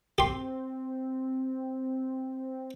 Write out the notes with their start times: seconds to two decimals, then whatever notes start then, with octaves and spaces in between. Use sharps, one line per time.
0.18 C4 G4 C6